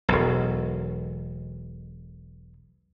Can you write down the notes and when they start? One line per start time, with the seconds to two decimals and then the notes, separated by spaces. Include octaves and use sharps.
0.08 E1 B1